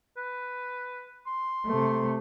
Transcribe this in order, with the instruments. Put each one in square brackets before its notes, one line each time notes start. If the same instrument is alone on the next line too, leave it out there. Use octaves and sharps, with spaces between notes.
[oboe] B4
C6
[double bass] C3 A3